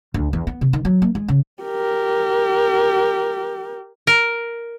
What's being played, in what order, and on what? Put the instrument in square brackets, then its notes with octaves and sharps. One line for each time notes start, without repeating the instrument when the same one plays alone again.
[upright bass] D2
E2
B3
C3
D#3
F#3
A#3
G#3
C#3
[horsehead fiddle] G4 A#4
[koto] A#4